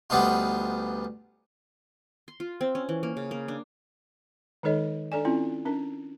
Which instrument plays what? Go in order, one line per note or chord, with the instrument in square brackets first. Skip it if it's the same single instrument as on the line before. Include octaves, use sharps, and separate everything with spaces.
[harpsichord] D2 G3 B3 D4 D#4 F4
[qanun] C6
F4
C4
C#4
E3
A#3
C#3
A#3
D4
[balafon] D#3 G#3 D#4 A4 C#5 D#5
D4 A4 D5 G#5
C4 C#4 E4 F4
C#4 D4 A#4